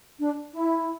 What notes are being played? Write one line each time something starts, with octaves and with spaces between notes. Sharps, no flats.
D4
E4